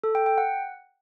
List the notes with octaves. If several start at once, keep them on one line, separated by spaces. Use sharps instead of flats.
A4
G5
G5
F#5